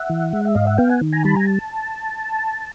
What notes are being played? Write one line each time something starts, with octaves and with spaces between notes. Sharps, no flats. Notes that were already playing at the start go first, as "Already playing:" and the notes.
Already playing: E5 F#5
E3
G#3
E5
G#2 D#5 F5
E5 F#5
B3 F5 G5
F#5 G#5
D#3
G#5 A#5
G3 A5 B5
G#5 A#5
A5